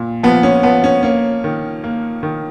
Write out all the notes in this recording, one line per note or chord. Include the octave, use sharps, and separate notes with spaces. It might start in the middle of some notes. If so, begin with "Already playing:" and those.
Already playing: A#2
F3 B3
C#4
F3 B3
C#4
A#3 C#4
D#3
A#3
D#3